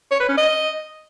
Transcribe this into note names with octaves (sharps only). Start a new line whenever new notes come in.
C#5
B4
C#4
D#5